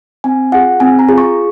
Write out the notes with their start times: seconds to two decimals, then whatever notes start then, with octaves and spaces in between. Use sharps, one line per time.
0.24 C4 G#5
0.52 F4 G#4 F#5
0.80 C4 G#5
0.99 A#5
1.08 F4 G#4
1.18 C#6